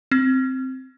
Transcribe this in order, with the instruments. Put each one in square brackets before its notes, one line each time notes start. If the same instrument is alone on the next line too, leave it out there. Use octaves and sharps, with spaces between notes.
[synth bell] C4